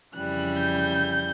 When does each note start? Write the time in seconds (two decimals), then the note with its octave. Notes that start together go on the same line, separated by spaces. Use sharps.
0.15 F2 C#3 E3 G3 F#6
0.58 G6